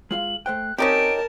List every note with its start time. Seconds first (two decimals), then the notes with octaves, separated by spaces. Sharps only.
0.11 G#3 F4 F5 F#7
0.46 A3 C5 G5 F#6
0.78 C4 C#4 D#4 G4 A#4 A5 D7